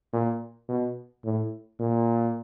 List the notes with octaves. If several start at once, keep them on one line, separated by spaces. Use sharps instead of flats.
A#2
B2
A2
A#2